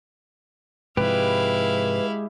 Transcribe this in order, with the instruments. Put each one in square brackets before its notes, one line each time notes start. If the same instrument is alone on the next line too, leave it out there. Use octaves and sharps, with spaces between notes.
[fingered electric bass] G#2 C3 F3 [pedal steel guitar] G#3 G4 [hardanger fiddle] E4 F5 [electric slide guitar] B4